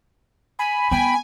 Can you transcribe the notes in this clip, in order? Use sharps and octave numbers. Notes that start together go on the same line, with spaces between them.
G#5 B5
B3 G5 G#5